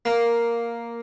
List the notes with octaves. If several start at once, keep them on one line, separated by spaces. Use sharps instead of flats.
A#3